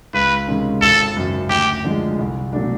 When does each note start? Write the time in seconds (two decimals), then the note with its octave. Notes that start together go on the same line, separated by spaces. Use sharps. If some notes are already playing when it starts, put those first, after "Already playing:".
0.14 C#2 B4
0.48 C3 D#3 G#3 C#4
0.81 G#1 A4
1.16 F#2 C#3
1.50 D2 G4
1.84 D3 F3 G#3
2.19 C2
2.53 B2 F#3 A3 D4